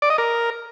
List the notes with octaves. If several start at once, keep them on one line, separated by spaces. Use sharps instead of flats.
D5
D#5
A#4